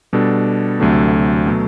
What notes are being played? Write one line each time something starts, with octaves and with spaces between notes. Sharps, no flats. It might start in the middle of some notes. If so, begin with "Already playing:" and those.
B2 G3 D4 A4
D2 C3 F#3 A3 D4
B2 F#3 A3